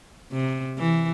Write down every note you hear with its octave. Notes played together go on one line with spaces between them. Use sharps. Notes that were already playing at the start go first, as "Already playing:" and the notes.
C3
E3